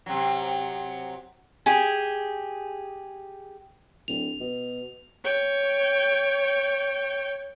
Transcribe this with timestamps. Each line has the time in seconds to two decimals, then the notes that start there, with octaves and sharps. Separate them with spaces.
0.06 C3 F#3
1.66 G4 G#4
4.08 D1 F7
4.40 B2
5.24 C#5 G5